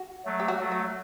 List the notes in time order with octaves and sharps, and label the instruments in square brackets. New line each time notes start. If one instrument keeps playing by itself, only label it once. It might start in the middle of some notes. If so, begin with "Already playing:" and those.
Already playing: [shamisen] F#4
[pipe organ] F#3 A3
[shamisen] G4
F#4
[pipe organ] F#3 A3
[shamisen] F#4